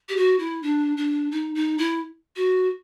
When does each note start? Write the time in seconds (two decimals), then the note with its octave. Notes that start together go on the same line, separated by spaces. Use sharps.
0.09 G4
0.17 F#4
0.39 E4
0.63 D4
0.97 D4
1.32 D#4
1.55 D#4
1.78 E4
2.36 F#4